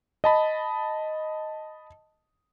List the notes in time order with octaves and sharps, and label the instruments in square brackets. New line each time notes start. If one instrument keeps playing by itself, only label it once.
[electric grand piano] D#5 A5 B5